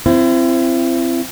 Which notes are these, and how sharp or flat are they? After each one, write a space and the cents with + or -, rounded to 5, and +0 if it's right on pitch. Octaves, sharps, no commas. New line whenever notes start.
C4 +0 E4 +35